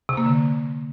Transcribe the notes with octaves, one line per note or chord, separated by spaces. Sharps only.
C3
A#3
D3